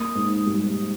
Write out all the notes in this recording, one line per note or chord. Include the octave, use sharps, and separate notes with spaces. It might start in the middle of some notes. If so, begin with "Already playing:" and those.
Already playing: A#3 D#6
G#2
G3